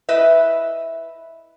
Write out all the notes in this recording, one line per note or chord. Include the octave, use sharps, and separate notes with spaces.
E4 B4 D#5 E5